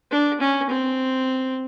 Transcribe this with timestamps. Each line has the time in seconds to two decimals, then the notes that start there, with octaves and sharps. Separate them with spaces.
0.11 D4
0.41 C#4
0.70 C4